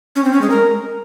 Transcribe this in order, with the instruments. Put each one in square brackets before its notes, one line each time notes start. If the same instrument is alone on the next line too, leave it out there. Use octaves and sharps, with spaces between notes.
[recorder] C#4
C4
C#4
G#3
A#4